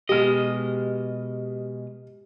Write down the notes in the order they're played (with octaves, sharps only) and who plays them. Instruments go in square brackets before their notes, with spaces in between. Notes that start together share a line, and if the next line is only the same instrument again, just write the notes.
[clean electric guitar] B2 G#3 D#5 [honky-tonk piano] G4 F6